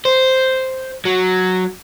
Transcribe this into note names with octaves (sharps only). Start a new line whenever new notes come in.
C5
F#3